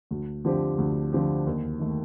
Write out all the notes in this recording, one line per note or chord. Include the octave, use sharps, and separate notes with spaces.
D2
D3 F3 C4 G4
D2
D3 F3 C4 G4
D#2
D#3 A3